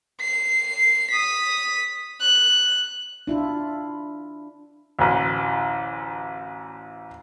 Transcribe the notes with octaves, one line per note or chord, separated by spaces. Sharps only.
C7
D#6 B6
F#6
D4 E4 F4
A1 D2